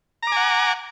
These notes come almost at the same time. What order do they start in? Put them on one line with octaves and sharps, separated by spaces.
A#5 D6 G#5 F#5